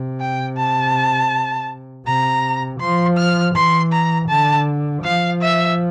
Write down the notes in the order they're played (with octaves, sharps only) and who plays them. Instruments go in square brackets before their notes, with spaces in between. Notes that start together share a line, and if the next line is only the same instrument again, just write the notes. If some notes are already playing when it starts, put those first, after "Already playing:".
Already playing: [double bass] C3
[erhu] G5
A5
[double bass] C3 [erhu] A#5
[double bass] F3 [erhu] C6
[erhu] F6
[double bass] E3 [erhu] C6
[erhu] A#5
[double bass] D3 [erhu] A5
[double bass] F3 [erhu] F5
[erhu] E5